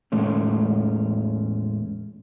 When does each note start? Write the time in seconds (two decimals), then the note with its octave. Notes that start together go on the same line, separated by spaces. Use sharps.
0.12 E2 A2 G#3 A3 C#4